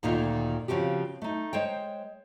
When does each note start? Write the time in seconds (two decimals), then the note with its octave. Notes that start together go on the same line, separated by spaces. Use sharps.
0.03 D2 A#2 D#3 D#4 F4
0.68 C#3 F3 C4 F#4 G4
1.22 A3 D#4
1.53 G#3 C5 C#5 G5